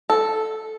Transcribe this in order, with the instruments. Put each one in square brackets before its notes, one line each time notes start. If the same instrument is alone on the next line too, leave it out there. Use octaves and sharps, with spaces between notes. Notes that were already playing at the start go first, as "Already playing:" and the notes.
[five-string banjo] A4